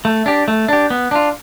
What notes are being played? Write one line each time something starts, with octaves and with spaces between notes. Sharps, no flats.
A3
D4 G4
A3
D4 G4
B3
D4 F4